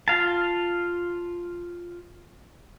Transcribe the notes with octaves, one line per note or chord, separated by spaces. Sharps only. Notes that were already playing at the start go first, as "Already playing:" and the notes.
F4 F5 A5